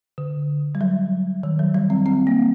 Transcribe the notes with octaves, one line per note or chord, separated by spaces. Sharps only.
D3
G3
F#3
D#3
F#3
G3
C4
C4
A#3